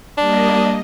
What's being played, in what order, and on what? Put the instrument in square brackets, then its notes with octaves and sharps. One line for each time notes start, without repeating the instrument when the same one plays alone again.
[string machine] G3 A#3 D#5 [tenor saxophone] D4